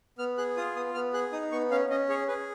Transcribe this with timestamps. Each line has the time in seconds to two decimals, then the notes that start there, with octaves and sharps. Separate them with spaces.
0.18 B3 F6
0.38 G#4 F#6
0.57 F4 D#6
0.76 B3 D#6
0.94 B3 F6
1.13 G#4 F#6
1.32 D#4 D#6
1.52 B3 C#6
1.71 C#4 F5
1.90 C#4 D#5
2.09 G#4 C#5
2.28 G#4 B4